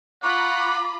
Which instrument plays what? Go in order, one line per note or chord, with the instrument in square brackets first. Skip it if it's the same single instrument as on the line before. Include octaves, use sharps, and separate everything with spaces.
[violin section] F4 A#5 B5 [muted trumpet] F#5 [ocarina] C#6 [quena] D6